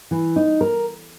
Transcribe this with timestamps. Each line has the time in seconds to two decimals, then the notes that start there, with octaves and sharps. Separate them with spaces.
0.11 E3
0.36 D#4
0.61 A#4